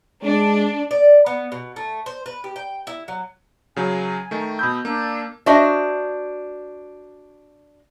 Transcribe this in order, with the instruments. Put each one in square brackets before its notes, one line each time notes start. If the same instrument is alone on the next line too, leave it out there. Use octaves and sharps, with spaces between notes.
[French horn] G#3 [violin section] D4
[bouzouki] D5
B3
B2
A3
C5
B4
G4
G5
E4
F#3
[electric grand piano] C#3 F#3 [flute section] G#5
[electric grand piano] D#3 A3
[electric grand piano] B2 B5 G6 [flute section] D#6 E6
[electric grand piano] A#3 [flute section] D4 D5 E6
[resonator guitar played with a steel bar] D4 F#4 C5 D#5 E5